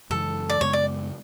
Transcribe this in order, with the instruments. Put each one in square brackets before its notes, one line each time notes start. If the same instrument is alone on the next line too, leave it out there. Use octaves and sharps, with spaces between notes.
[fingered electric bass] F#2 C#3 E3 G#3 [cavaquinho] A4
[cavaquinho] D5
[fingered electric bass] F#2 C#3 G#3 B3 [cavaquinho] C#5
[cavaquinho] D5